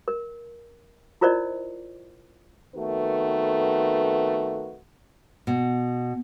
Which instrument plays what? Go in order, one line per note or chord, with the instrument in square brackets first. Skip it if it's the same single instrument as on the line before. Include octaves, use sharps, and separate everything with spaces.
[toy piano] A#4
E4 F4 A#4 C5 D5 D#5
[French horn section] F2 D#3 A3 B3 F#4 B4
[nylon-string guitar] B2